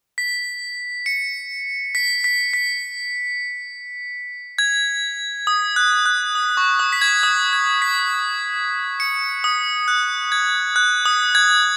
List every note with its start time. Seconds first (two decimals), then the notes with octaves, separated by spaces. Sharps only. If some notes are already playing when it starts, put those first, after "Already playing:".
0.18 B6
1.06 C#7
1.95 B6
2.24 B6
2.54 B6
4.59 G#6
5.47 D#6
5.76 F#6
6.06 F#6
6.35 D#6
6.57 C#6
6.79 D#6
6.93 B6
7.01 G#6
7.23 D#6
7.53 G#6
7.82 B6
9.00 C#7
9.44 D#6
9.88 F#6
10.32 G#6
10.76 F#6
11.05 D#6
11.35 G#6